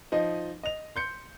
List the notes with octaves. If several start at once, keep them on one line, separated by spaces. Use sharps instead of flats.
F3 D#4 D#5
D#5 F7
C6 G6 C#7